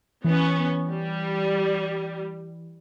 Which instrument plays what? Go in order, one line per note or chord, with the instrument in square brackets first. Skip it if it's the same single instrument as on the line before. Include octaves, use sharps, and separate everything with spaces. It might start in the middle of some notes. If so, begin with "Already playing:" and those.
[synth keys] E3 [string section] B3 C#4
[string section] G3